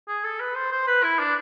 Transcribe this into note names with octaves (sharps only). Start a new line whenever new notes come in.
G#4
A4
B4
C5
C5
B4
E4
D4